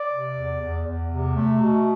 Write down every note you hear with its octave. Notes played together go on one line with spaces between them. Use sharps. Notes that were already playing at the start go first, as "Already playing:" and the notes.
Already playing: D5
C3
E2
E2
E2
C3
A3
B2